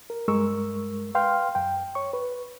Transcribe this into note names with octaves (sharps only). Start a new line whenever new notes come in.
A#4
G2 G#3 A#4 C#6 E6
B4 F5 G5 C6 F6
F#2 G5
C#5 C#6
B4